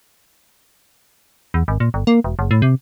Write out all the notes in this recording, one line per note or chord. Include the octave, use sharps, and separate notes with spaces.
E2
G#1
A#2
G1
A#3
E1
F#1
A2
C3